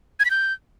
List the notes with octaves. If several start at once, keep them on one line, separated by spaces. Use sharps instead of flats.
G#6
B6
G6